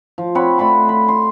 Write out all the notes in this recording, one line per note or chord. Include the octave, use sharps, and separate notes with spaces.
F3
C4 C#5 F#5 B5
A3 D5 B5 C6
B5
C6